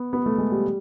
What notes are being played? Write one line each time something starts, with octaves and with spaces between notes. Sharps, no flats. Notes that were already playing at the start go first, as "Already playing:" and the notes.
Already playing: B3
B3
A3
G#3
G3